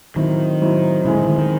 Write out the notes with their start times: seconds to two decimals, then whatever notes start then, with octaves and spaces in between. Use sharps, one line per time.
0.16 A2 D#3 F#3 C4
0.60 A2 F#3 C4
1.05 A2 C#3 G#3 C4
1.16 D#3
1.27 D#3
1.38 D#3